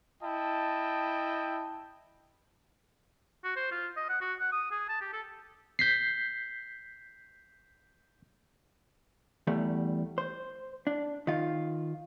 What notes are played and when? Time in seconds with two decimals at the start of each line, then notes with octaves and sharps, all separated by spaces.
0.23 E4 D#5 G5 A5
3.44 F#4
3.56 C5
3.72 F4
3.97 D#5
4.09 F#5
4.21 F#4
4.40 F#5
4.52 D#6
4.71 G#4
4.89 A5
5.01 G4
5.13 A4
5.79 G6 B6 C7
9.47 E2 G3 A3
10.18 C5
10.87 D4
11.27 D#3 F4